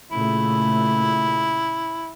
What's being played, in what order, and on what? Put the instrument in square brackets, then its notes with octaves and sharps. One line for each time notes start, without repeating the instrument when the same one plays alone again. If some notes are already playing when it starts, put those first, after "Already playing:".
[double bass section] A#2 C#3 A3 [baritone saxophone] E4